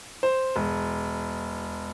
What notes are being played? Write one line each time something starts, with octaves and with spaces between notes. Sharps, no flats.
C5
E1